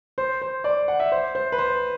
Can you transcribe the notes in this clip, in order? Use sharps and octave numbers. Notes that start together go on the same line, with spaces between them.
C5
C5
D5
F#5
E5
C5
C5
B4
C5